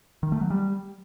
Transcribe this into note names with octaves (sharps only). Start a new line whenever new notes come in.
D#3
A3
F#3
G3